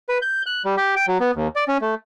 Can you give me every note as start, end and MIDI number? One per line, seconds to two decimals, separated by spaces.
0.09 0.18 71
0.22 0.42 91
0.46 0.63 90
0.65 0.75 55
0.77 0.95 67
0.96 1.06 79
1.08 1.18 54
1.20 1.31 59
1.35 1.48 39
1.56 1.64 74
1.68 1.78 61
1.81 1.95 57